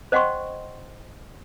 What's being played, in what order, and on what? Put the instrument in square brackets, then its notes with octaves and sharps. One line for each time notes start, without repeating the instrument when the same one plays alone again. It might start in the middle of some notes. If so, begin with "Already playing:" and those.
[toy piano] C5 D#5 F#5 G5 C6 C#6